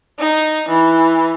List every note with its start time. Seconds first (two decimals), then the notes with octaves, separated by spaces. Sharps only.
0.19 D#4
0.69 E3